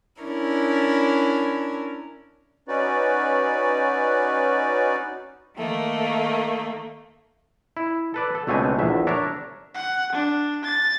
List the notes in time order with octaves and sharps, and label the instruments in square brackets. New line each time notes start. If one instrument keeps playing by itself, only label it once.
[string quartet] C#4 D4 E4 A#4
[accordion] C#4 D#4 F#4 B4 D5
[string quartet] D#3 A3 A#3
[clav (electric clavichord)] E4
A4 B4 D5
A4
C#2 B2 A3 C4 D4 G#5
A#1 E2 E5
D4 A#4 C#5 E5
[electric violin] F#5
D4
A6